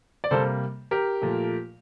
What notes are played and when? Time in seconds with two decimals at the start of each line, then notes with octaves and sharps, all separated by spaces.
0.24 D5
0.31 C3 G3 A#3 A4 C5
0.91 G4 A#4
1.22 A#2 F3 A3